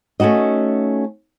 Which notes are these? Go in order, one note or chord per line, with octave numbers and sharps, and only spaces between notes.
A3 C#4 D#4 F#4 D#5